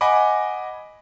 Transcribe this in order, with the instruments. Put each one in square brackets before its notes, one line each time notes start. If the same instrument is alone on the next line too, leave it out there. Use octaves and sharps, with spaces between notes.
[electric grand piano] D#5 F#5 G#5 B5 D6